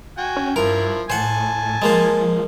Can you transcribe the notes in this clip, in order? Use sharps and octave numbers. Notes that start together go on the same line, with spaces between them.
F#4 G5 G#5
C#4
G2 F3 E4 A#4
A2 C5 F#5 G#5 A5
F3 G#3 A#3 C5